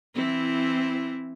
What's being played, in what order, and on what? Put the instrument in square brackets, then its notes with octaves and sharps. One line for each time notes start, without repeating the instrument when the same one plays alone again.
[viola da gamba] E3 C4 E4